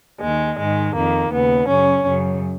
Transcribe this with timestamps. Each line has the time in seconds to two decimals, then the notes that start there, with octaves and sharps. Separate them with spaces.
0.21 D#2 D#3 G#3
0.58 G#2 D#3 G#3
0.95 F2 D#3 A#3
1.32 D#2 C#3 B3
1.68 F#2 C#3 C#4
2.06 F#2 C#3